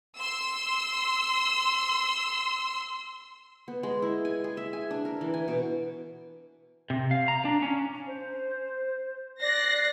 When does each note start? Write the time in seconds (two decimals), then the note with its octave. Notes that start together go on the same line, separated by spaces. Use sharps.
0.17 C6 E6
3.68 B3
3.83 G#3
4.02 E4
4.25 G#5
4.44 G#4
4.57 E5
4.73 G#5
4.91 D4
5.05 A#4
5.21 E3
5.34 G#5
5.48 B2
6.90 C3
7.11 F5
7.28 A#5
7.45 D4
7.62 C#4
8.07 C5
9.41 D5 F#6 A#6 C7